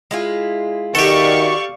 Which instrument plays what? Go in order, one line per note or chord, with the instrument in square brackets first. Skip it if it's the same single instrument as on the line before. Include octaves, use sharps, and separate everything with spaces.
[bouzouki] G#3 E4 F4
[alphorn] D#3 [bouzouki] F#4 E5 [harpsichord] G4 A4 [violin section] D5 F5 C#6